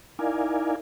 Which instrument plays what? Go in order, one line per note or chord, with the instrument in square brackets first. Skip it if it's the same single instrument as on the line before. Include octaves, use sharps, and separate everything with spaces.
[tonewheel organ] D#4 E4 A#4 D5 F5 G#5